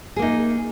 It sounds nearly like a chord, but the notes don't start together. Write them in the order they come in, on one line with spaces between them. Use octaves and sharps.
G#4 A#3 D#4